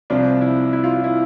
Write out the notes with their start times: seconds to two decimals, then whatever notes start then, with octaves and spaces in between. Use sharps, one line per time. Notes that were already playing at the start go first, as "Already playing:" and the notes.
0.10 C2 C3 F3 D4
0.41 E4
0.73 E4
0.84 F4
0.94 F4
1.04 E4